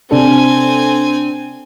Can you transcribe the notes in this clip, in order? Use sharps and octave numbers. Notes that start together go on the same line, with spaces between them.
C3 C4 D4 A4 G#5